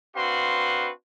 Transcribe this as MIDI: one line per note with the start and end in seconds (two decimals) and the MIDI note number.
0.16 0.90 60
0.16 0.90 62
0.16 0.90 66
0.16 0.90 71
0.16 0.90 77
0.16 0.90 84